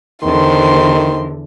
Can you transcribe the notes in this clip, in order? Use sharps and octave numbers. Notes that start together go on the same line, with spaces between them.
E2 D3 D#3 C5 C6